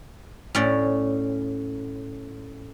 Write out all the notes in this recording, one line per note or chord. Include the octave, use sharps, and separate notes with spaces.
A2 C#4 D5